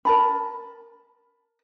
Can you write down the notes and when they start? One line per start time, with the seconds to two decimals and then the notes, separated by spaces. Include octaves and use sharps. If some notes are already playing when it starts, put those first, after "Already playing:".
0.05 A#4 A5 B5